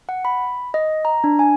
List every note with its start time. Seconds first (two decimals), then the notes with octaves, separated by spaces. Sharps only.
0.09 F#5
0.25 B5
0.74 D#5
1.05 A#5
1.24 D4
1.39 G#5